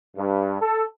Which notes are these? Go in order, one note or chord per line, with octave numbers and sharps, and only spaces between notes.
G2
A4